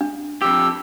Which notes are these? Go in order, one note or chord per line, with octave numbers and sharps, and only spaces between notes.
D4
F2 G4 E6